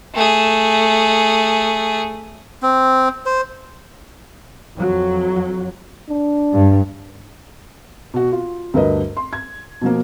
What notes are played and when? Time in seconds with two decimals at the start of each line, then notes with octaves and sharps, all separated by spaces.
0.15 A3 G#4
2.62 C4
3.26 C5
4.75 F2 F#3
6.09 D4
6.53 G2
8.14 B2 F#4
8.32 F4
8.74 D2 G2 A#4 B4 D#5
9.17 C6
9.33 G#6
9.81 B2 F3 A#3